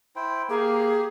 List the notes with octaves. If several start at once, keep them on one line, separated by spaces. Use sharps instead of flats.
E4 C5 G5
A#3 G4 G#4